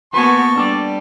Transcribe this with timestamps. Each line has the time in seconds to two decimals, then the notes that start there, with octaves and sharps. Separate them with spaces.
0.14 A#3 B3 F#4 B4 C5 G#5 A5 C#6
0.56 G3 D4 A4 D5